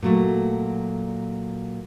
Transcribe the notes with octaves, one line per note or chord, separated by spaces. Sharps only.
A#2 F#3 A3